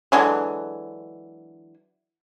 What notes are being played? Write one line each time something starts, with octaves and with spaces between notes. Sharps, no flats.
D3 E3 F#3 G#3